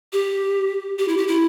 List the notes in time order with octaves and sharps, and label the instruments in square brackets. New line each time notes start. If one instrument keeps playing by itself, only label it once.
[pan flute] G4
G4
E4
G4
E4